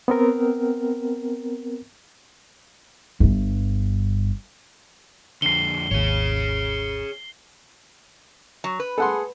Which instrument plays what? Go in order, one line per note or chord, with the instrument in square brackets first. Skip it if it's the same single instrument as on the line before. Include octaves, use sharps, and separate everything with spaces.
[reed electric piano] B3 C4 A#4
[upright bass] G1 G2
[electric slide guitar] F2 D3 [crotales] C7 G7
[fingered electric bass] G#1 D#2 [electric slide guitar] G#4 C#5
[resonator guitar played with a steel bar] F#3
B4
[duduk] G#4 [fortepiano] A4 F#5 C6